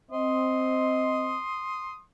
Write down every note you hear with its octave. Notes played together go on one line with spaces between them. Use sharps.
C4 D#5 C6 D#6